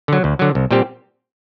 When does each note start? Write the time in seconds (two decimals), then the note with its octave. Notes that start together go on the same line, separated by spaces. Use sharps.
0.08 D3 F#3
0.24 D2
0.39 D3 F#3
0.55 C2
0.71 A#2 G3 C4 G4